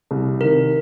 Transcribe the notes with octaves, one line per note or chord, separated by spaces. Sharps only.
C2
C3 D#3 A#4